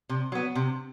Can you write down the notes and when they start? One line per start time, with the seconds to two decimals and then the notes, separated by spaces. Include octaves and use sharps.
0.09 C3
0.32 F#3 B3
0.55 C3